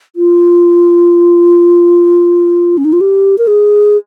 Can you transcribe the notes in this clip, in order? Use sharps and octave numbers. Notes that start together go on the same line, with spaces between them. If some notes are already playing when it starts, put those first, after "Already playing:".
F4
C#4
D#4
F4
G4
A#4
G#4